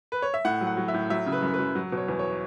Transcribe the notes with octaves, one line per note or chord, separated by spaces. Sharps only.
B4
C#5
E5
A2 F#5
F#3
F#5
F#3
E5
A2
F#3 E5
C#3
B4
F#2
B4
F#2
F#3
B2
C#5
E2
C#5